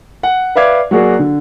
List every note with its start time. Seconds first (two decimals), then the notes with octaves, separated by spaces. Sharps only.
0.23 F#5
0.56 B4 D5 E5 F5 D6 G#6
0.91 F#3 A#3 F#4 G#4 D5
1.19 D3